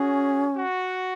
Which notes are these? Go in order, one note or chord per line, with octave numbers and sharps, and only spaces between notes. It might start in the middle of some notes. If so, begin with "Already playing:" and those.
Already playing: C#4 F#4 G#4
F#4